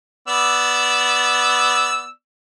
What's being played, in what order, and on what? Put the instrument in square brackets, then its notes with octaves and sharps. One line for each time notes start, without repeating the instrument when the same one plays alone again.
[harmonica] B3 D5 E6